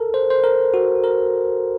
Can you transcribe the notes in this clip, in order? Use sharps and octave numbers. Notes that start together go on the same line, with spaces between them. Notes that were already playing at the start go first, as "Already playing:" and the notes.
Already playing: A4 A#4
C5
C5
A#4
F#4
A#4